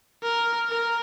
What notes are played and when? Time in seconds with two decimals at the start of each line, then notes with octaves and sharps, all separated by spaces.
0.23 A#4
0.69 A#4